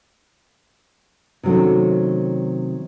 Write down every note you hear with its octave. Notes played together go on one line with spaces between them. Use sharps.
C3 D#3 F#3 A3 C#4